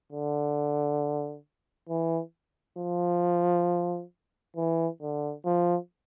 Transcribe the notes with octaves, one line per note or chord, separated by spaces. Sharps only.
D3
E3
F3
E3
D3
F3